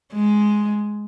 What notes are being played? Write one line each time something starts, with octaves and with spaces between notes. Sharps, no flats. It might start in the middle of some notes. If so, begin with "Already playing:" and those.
G#3